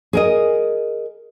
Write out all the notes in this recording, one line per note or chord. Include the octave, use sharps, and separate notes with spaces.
G#4 A#4 D#5